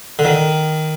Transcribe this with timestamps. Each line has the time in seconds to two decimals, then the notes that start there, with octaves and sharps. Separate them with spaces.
0.19 D3
0.25 D#3